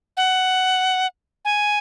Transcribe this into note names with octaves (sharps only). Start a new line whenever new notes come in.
F#5
G#5